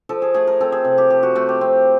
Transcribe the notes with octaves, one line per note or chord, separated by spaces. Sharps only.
F3 A4
G#4
A3 G#4
A#4
C4 A4
G#4
C3
G4
F3 G4
F#4
A3 F#4
G4
C4